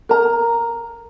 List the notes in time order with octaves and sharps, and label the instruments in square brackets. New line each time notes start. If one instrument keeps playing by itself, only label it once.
[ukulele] A#4 A#5